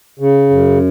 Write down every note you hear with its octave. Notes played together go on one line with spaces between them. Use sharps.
C#3
F#2